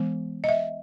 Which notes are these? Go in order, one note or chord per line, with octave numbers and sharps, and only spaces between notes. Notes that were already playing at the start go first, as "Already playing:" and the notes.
Already playing: E3 G#3 B3
D#5
E5